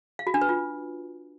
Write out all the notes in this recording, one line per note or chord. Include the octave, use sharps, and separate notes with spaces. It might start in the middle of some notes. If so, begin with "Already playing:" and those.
F5
F#4
D4
B4
F4